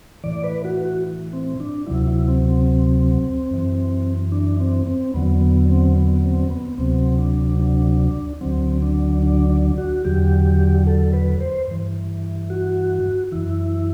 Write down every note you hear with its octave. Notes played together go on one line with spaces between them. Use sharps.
A2 E3 D5
B4
F#4
F#4
C4
D4
D2 C3 F#3 E4
E4
C4
C4
F#2 E3
D4
C4
C4
E2 D3 F#3 B3
B3
C4
B3
C4
B3
D2 C3 F#3 C4
D4
D4
D2 D3 F#3 C4
D4
D4
D4
F#4
E2 D3 F#3 G4
A4
B4
C5
G2 E3
F#4
F#2 E3 E4